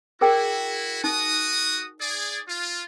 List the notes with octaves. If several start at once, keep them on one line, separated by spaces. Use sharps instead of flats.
E4 F#4 G#4 A#4 G5
D#4 F#4 D#6
G#4 D5
F4